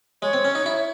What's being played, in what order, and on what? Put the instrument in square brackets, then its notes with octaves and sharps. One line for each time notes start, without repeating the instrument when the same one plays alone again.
[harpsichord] G#3 [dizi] C#5
[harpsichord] C4
C#4
D#4
E4